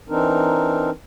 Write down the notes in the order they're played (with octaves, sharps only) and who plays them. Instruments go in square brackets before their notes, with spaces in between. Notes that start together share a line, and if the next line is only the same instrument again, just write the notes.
[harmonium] E3 C4 D4 D#4 A#4